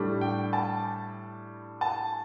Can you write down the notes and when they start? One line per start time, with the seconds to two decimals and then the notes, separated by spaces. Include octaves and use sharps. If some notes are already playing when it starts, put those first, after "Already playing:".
Already playing: A2 G3 D4
0.21 G5
0.53 A5
1.81 A5